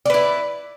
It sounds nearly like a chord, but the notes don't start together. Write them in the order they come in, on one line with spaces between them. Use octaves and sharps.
D5 B4 E4